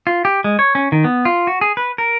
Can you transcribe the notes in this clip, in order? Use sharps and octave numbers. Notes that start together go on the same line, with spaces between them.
F4
G4
G#3
C#5
C#4
D#3
B3
F4
F#4
G#4
B4
A#4